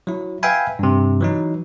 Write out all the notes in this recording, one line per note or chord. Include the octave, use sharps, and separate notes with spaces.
F#3 E4
B4 E5 F5 G5 G#5 B5
G2 C3
E3 F#3 D#4